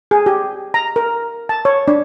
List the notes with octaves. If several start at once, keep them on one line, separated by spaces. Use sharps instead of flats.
G#4
G4
A#5
A#4
A5
C#5
D4